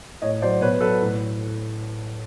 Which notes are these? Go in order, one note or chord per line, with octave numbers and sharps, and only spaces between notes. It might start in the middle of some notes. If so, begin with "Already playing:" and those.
A2 C#5 D#5
F#3 C5 D5
B2 B4 C#5
F#3 A4 B4
A2